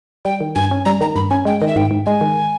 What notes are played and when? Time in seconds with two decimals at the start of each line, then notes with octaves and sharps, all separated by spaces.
0.25 G3 G5
0.41 D#3
0.55 G2 G#5
0.71 C#4
0.85 G3 A#5
1.01 D#3 A#5
1.16 G2 B5
1.30 C#4 G#5
1.45 G#3 G5
1.60 D#3 D#5
1.67 E5
1.76 G#2 G5
1.91 G#2
2.06 G#3 G#5
2.21 D#3